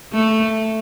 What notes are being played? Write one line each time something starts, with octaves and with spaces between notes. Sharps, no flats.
A3